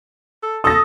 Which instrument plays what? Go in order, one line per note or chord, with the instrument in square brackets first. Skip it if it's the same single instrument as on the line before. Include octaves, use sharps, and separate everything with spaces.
[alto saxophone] A4
[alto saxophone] A4 [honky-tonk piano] D#6 A#6